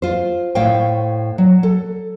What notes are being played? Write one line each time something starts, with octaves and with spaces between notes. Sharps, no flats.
F4 C5
A2 C5 C#5 F5 G5
F#3
A4